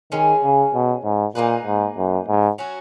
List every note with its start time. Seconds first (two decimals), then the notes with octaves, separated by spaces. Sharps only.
0.12 D#3 G#3 C#4 G#4
0.43 C#3
0.74 B2
1.04 G#2
1.35 A#2 A#3 D#4 G#4 B4
1.66 G#2
1.97 F#2
2.28 G#2
2.58 F#3 C#4 F#4